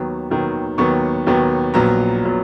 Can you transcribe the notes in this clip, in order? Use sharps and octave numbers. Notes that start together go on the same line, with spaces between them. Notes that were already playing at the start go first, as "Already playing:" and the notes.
Already playing: D#2 D#3 F#3 B3
D#2 D#3 F#3 B3
D#2 D#3 F#3 B3 C#6
D#2 D#3 F#3 B3
A#1 A#2 F#3 B3 A#5
A#2 F#3 B3